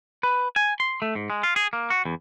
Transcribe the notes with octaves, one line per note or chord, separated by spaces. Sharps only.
B4
G#5
C6
A3
G#2
G#3
F4
G#4
A#3
F#4
E2